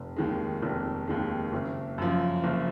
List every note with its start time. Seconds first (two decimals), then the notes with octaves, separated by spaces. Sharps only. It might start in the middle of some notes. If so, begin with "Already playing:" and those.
Already playing: F1
0.16 D#2 D#3 G#3
0.62 F1
1.08 D#2 D#3 G#3
1.53 F#1
1.98 F#2 F3
2.44 F#1